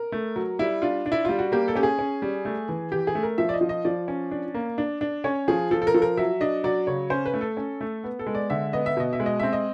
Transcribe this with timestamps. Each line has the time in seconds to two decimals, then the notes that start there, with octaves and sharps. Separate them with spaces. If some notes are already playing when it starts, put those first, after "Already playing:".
Already playing: A#4
0.12 A3
0.36 F#3
0.59 G3 E4
0.82 D4 F4
1.06 D4
1.12 E4
1.25 G3 F4
1.39 F#4
1.52 A#3 G4
1.68 A4
1.75 C#4 G4
1.83 G#4
1.99 C#4
2.22 G3
2.45 A3
2.69 E3
2.92 E3 G4
3.07 G#4
3.15 A3
3.23 A#4
3.38 F3 E5
3.49 D5
3.54 D#5
3.61 F3
3.69 D#5
3.85 F3 D5
4.08 C#4
4.31 D4
4.54 A#3
4.78 D4
5.01 D4
5.24 C#4 C#5
5.48 F3 G#4
5.71 F3 A4
5.82 A4
5.87 A#4
5.94 F3 A4
6.02 A#4
6.17 F#3 E5
6.41 D4 D#5
6.64 F#3 D5
6.87 C#3 C#5
7.10 C#4 C5
7.26 B4
7.34 A3
7.41 A4
7.57 C#4
7.81 A3
8.04 B3
8.19 A4
8.26 G#3
8.35 D5
8.50 D3 E5
8.73 B3 D#5
8.86 E5
8.97 B2 D#5
9.13 E5
9.20 G#3
9.26 D#5
9.40 C4 E5
9.53 D#5